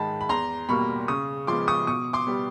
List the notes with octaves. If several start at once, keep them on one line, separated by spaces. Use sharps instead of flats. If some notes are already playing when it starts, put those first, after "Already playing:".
Already playing: G#2 D#3 G#3 A5 B5
B5
E2 A#5 C6
B2 G3 A#3 B5 C#6
C#3 C#6 D#6
F3 G#3 B3 C6 D6
C#6 D#6
B2 C#6 D#6
C6 D6
G3 B3